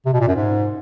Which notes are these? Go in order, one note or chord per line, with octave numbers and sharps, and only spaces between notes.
C3
B2
A#2
F#2
G#2